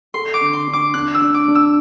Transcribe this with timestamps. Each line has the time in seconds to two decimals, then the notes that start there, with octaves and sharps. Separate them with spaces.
0.14 A4 C6
0.34 D6
0.41 D3
0.53 C6
0.68 D4
0.73 D6
0.94 D4 F#6
1.14 E6
1.22 D4
1.34 D6
1.48 D4
1.55 E6